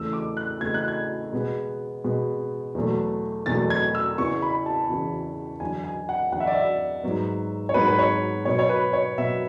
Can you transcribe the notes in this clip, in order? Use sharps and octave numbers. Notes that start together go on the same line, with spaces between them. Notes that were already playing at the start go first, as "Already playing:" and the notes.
Already playing: E2 C#3 E3 A3 E6
D6
F#6
E2 C#3 E3 A3 G#6
F#6
G#6
B2 G#3 B3
B2 G#3 B3
E2 B2 F#3 A3
E2 B2 F#3 A3 A6
G#6
E6
E2 C#3 E3 B3 C#6
B5
A5
E2 C#3 E3 B3
E2 D3 F#3 G#5
G#5
F#5
E2 D3 F#3 F#5
E5
D5
E5
G#2 F#3 B3
C#5
G#2 F#3 B3 B4
B4
C#5
B2 F#3 B3 C#5
C#5
B4
C#5
B2 F#3 B3 E5